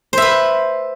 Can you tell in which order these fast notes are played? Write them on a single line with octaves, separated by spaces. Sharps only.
C5 E5 B4